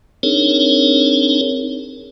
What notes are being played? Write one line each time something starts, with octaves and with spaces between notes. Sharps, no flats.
C4 D4 D#4 G#4 A#4 C#5